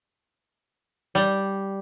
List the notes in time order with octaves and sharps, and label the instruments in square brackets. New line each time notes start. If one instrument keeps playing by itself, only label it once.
[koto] G3